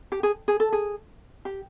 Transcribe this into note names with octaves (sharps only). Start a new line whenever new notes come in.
G4
G#4
G#4
A4
G#4
G4